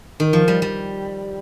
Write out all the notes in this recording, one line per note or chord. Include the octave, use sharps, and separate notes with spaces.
D#3
F3
G3
G3